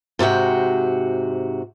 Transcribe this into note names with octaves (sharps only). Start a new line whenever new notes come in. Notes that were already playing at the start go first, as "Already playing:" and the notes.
G#2 C3 F#4 G5